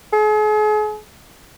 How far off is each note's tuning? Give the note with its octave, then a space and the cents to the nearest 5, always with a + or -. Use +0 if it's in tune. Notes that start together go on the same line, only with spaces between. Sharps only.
G#4 +40